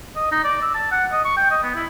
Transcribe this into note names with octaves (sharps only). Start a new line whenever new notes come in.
D#5
D#4
D5
E6
A5
F#5
D#5
C#6
G5
D#5
B3
E4